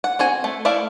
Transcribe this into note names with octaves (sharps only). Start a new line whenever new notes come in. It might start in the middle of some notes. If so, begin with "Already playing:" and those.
F#5
C4 F#4 G#5
A3
A3 E4 D5 E5 F5